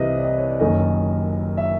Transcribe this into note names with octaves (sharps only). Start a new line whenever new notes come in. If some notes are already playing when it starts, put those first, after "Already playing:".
Already playing: C2 C3 E3 B4 D#5 E5
D5
D#5
C#5
D5
F#1 F#2 D#3 D#5
E5